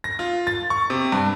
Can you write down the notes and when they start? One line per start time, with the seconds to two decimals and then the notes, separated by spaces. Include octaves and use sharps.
0.04 A#6
0.19 F4
0.47 A6
0.70 C#6
0.90 C3
1.12 G2